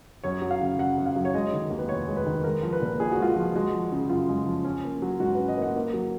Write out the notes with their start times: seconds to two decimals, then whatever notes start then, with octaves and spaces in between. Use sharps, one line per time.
0.24 F#2 C#5
0.41 F#3
0.51 F5
0.61 C#3
0.79 F#2 F#5
0.98 F#2
1.06 F5
1.16 F#3
1.25 C#5
1.34 G#3 D#5
1.53 D#3
1.70 D#2
1.78 B4
1.89 F1 C#5
2.08 G#3
2.16 B4
2.26 D#3
2.44 G#3 A#4
2.63 F3
2.73 B4
2.82 A#2 A#4
3.00 A#1 G#4
3.12 F#4
3.17 G#3 F4
3.34 F3 F#4
3.55 G#3 F#4
3.74 F3
3.92 C#3
4.09 F#2 F4
4.29 G#3
4.46 F3
4.65 C#4
4.84 A#3
5.02 F#3
5.20 G#2 F#4
5.35 C#4 B4
5.48 D#5
5.58 A#3 F#5
5.76 A#3
5.93 F#3